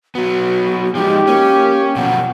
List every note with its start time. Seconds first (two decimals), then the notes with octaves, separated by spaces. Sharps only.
0.15 F#3 B3 F#4
0.95 F3 G#3 D#4 G4
1.27 A#3 C#4
1.96 B2 F3 F#3 F#5